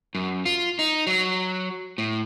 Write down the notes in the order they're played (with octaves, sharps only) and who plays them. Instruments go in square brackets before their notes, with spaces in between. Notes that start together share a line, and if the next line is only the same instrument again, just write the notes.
[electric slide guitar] F#2
F4
D#4
F#3
A2